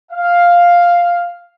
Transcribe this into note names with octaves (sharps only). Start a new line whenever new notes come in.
F5